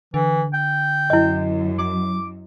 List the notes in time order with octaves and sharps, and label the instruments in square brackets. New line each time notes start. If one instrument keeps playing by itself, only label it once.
[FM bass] D3 [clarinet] E3
[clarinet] G5
[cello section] F#2 [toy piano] E4 D#5
[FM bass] F#3 [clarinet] D6